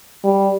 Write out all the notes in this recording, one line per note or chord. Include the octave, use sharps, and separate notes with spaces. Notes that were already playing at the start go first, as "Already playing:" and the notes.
G3